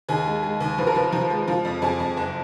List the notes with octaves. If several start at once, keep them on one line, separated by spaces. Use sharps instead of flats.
D#2 G#4
G#3
G#3
D#2
F3 B4
A#4
F3 B4
F3 F4
G#3
F3 F4
F2
F2 G#4
F2
F#1